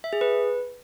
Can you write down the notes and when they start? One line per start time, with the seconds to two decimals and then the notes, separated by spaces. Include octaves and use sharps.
0.04 E5
0.13 G#4
0.21 B4